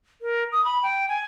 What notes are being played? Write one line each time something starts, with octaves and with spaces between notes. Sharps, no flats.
A#4
D#6
B5
G5
G#5